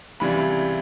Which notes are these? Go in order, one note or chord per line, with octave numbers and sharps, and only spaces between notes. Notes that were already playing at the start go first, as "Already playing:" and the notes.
C#2 C3 E3 G3 B5